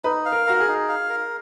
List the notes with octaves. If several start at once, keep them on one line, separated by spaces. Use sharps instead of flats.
D#4 B4
F5
A#4
F#4 A#4
G#4
D#4
F5
A#4